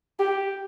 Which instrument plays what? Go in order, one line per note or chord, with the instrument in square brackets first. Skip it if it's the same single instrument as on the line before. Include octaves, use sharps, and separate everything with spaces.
[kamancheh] G4